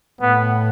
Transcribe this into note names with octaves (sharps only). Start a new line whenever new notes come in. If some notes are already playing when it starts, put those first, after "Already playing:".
A2 B3